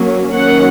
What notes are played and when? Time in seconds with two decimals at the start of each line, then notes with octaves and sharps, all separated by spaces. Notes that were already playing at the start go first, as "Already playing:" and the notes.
Already playing: F#3 A#3 C#4
0.34 D#3 F#3 A#3 C#4 F#5